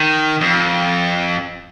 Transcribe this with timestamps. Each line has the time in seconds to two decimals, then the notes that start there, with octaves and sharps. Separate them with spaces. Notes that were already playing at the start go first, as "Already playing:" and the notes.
Already playing: D#3
0.41 F2